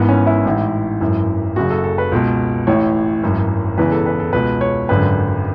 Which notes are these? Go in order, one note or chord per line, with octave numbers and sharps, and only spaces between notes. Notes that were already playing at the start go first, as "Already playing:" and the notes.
Already playing: G#1 G#2 E3 B3
C#4
E4
A1 G#2 E3
G#1 F#2 E3
F#1 F#2 C#3 F#4
A4
A4
B4
C#2 B2
A1 A2 E3 C#5
G#1 F#2 E3
E1 E2 C#3 E3 B4
A4
B4
A4
C#2 B2 B4
C#5
G#1 F#2 D3 B4